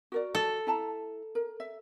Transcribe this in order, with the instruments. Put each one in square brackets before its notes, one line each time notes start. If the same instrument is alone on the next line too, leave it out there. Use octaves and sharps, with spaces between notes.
[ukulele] F#4 A#4 D5
[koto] A4
[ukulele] E4 A5 A#5
A#4
E5